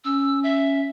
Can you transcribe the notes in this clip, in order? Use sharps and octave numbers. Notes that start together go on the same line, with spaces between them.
C#4 E6
E5